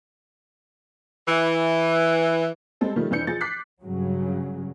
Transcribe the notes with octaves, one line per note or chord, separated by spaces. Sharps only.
E3
G3 G#3 C4 A4
D#3 F3 G3 A3
F2 E3 D4 G6 C#7
F3 G#4 A6
D6 F#6 B6 C7
G2 C#3 F#3